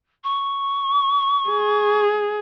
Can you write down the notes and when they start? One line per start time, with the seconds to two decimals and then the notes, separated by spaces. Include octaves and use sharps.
0.24 C#6
1.49 G#4